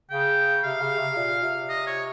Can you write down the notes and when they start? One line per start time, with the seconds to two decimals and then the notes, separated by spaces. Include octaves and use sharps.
0.11 C#3 G5
0.64 C3 F5
0.82 C#3
0.99 C3
1.16 A#2
1.43 C3
1.70 D#5
1.87 C#5